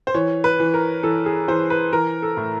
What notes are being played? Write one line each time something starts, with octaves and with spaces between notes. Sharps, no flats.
C5
E3 C#5
B4
E3
A#4
E3 A4
G#4
E3 C5
B4
E3 A#4
A4
A2